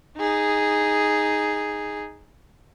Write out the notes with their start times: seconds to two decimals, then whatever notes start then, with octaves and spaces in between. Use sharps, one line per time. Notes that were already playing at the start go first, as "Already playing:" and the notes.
0.17 D#4 G#4